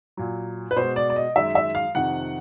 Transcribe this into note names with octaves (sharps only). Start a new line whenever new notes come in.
A#2 F#3
B4
B2 G#3 C5
D5
D5
D#5
F#2 D#3 G#3 E5
E5
F5
F2 C3 D#3 F#5